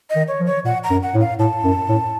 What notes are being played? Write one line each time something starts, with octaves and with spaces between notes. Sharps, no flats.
D#5
D#3
C#5
F3
C#5
A#2 F#5
A#5
F#2
F#5
A2
F5
A2 A5
F#2
A2